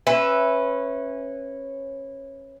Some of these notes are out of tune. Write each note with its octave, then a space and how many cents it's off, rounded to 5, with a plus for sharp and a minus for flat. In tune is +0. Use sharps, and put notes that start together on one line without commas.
C#4 -20 B4 +0 E5 +0